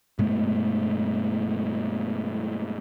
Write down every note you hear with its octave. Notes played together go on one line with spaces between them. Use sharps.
G2 B2 G#3 A3